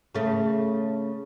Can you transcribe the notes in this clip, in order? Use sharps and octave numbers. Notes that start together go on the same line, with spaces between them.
C#3 A3